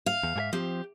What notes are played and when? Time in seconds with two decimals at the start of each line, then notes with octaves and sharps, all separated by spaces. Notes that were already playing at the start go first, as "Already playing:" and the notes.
0.06 F5
0.23 E2
0.36 G#2 G#4 E5
0.53 F3 C4 G4